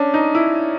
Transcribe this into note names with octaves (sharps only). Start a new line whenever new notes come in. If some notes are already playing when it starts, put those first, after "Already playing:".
Already playing: C#4 D4
D#4
E4